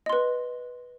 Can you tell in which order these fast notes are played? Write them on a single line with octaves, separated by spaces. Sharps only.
D#5 C6 B4